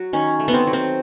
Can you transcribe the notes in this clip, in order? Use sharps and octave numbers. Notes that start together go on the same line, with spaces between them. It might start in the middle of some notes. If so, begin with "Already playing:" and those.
Already playing: F#3 F#4
D#3 C#4
A3
B3
C4
F#3
C4